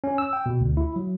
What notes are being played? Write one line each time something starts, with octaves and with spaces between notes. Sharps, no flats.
C#4
E6
G5
B2
D2
E4
F#3